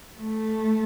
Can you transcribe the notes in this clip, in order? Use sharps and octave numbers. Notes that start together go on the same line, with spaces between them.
A3